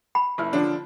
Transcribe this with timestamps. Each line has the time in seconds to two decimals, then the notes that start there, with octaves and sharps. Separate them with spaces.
0.15 B5
0.38 F#1 E4 F6
0.53 D3 F3 D4